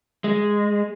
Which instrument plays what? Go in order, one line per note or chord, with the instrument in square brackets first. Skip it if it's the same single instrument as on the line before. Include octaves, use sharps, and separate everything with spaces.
[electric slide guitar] G#3